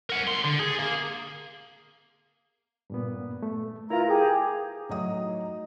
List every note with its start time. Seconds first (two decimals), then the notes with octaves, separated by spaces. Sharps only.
0.10 A#4 F#5
0.28 A2 C6
0.45 D3
0.60 G#4
0.79 A#3
2.90 G2 A#2 B3
3.43 A3
3.90 E4 F4 A#4 B4 A#5
4.09 G4 G#4
4.89 A2 F#3 D#4 D#6